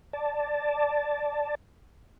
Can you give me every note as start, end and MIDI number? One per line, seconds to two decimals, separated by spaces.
0.13 1.55 74
0.13 1.55 81